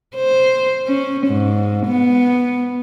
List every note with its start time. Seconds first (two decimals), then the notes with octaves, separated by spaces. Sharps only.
0.16 C5
0.87 C#4
1.27 G#2
1.86 B3